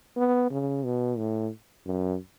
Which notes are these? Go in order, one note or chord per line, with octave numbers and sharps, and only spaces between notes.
B3
C#3
B2
A2
F#2